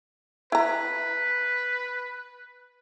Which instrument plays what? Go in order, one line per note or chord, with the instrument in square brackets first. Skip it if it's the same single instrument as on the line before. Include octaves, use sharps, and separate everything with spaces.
[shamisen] E4 A#5 [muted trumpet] B4